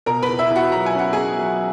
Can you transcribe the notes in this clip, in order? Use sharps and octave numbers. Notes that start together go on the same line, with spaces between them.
B2 A#4 A#5
B4 B5
E2
E4 E5
E2
F#4 F#5
F#3 A#5
G#5
C#4 F#5
C#4 G#4 G#5
F#3